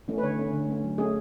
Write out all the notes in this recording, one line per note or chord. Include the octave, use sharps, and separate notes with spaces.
E3 A3 C#4
B4
D3 C#5
A3 C#4
D3
A3 C#4
F#3
A3 C#4 G#4